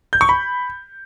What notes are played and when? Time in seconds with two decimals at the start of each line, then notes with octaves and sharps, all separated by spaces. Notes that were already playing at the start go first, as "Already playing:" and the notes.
0.13 G6
0.21 C#6
0.29 B5